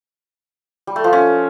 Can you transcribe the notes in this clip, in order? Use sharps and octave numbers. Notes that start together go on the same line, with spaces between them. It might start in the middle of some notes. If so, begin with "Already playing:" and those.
G3
A3
F3
C#4